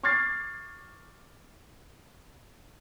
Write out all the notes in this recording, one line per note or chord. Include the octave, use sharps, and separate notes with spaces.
C#6 D6 F6 G#6 A6 C7